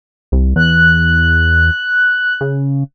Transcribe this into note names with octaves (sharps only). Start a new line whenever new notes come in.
C2
E2 F#6
C#3